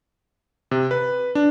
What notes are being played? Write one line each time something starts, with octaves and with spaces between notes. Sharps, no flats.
C3
B4
D4